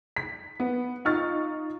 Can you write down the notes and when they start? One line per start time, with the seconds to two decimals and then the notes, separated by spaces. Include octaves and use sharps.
0.16 B6
0.60 B3
1.05 D#4 F4 C#6 F6 A6